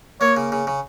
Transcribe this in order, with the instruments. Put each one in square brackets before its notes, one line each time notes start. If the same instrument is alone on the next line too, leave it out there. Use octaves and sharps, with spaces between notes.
[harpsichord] A#3 [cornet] C#5
[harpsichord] C#3
C#3
C#3